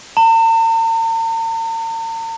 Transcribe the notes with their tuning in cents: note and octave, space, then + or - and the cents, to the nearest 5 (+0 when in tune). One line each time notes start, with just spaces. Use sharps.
A#5 -45